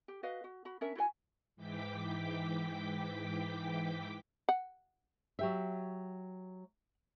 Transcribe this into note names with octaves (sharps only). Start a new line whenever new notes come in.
G4
F#4 B4 D#5 F5
F#4
F#4 B5
C#4 D4 A#4 E5
E4 F#4 B4 G#5
G#2 E3 G5 D6 B6
F#5
F#3 G4 E5